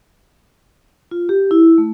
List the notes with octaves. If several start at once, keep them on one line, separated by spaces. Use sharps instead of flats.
F4
G4
E4
A3